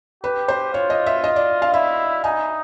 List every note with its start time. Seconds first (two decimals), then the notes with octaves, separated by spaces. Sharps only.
0.24 G4 B4
0.48 C5
0.73 F4 C#5
0.90 D#5
1.06 E5
1.24 D#5
1.36 D5
1.62 F5
1.74 E4 E5
2.24 D#4 G#5